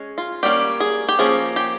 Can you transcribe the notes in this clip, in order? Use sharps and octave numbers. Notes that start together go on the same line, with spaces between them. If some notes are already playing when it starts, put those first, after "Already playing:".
Already playing: G#3 C#4
F4
G3 A#3 C#4 G4
G#4
G4
F3 A#3 C#4 G#4
G4